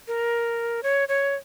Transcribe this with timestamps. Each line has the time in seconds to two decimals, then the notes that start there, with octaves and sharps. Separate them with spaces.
0.08 A#4
0.83 C#5
1.09 C#5